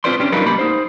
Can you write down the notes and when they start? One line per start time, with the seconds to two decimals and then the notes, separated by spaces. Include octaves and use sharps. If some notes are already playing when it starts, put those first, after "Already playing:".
0.04 C4 F4 B4 C5 D5 C6
0.20 C#4 D4 G4
0.32 F#3 G3 D#4 F4 A#4 B4
0.45 C2 A#3 G4 B5
0.59 D#4 C5